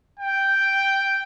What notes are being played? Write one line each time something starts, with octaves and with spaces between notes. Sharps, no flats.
G5